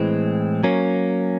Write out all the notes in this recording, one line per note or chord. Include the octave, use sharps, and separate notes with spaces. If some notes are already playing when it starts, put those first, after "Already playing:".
Already playing: A2 E3 G#3 C4
F#3 A#3 C#4